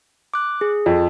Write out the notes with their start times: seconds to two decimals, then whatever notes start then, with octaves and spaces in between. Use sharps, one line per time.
0.34 D6 F#6
0.61 G#4
0.86 F2